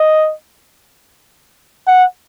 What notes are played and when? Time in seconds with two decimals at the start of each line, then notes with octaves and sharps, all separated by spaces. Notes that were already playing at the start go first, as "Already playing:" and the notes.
Already playing: D#5
1.88 F#5